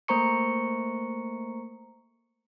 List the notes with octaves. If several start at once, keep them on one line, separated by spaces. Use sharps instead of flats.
A3 A#3 C5 A#5 C#6 C#7